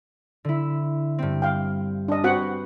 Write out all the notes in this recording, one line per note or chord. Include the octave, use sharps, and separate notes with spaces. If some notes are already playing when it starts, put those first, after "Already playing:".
D3 E4
G2 C4
F5 G5
D4 D#5
C4 F#4 B4 C5 F#5 F#6